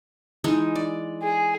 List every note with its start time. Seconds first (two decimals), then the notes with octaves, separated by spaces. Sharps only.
0.44 E3 G#3 D#4
0.75 D5
1.23 G#4